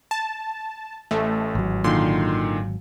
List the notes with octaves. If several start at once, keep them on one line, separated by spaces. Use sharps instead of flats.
A5
A1 A3
G#1 F#3
A#2 D3 D#3 C6